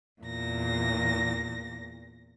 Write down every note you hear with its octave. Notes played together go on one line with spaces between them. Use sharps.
E2 A#2 A#6